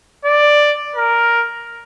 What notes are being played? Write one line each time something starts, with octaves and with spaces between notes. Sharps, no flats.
D5
A#4